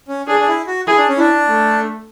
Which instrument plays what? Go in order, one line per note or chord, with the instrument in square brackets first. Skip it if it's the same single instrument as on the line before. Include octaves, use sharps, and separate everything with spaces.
[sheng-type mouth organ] C#4
[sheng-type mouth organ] D4 [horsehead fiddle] G#4
[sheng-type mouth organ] D4
E4
F#4
[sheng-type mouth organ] E4 [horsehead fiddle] G#4
[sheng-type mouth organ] D4
C#4
[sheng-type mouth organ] D4 [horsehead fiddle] E4
[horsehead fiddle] A3